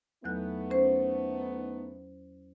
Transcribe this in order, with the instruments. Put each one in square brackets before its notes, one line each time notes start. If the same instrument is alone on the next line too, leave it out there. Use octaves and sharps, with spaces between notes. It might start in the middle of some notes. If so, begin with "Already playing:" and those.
[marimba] E2 F#3 F#6 [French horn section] A3 B3 D#4
[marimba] C#4 C5